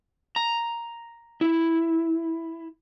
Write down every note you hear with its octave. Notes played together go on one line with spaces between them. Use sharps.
A#5
E4